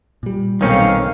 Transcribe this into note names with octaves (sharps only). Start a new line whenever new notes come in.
A#2 G3
B1 D#3 A#3 C4 C#4 F5